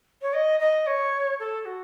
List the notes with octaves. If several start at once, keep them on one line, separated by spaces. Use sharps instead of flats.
C#5
D#5
D#5
C#5
A4
F#4